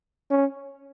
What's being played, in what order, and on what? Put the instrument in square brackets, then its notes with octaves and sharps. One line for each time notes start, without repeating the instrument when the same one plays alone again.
[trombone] C#4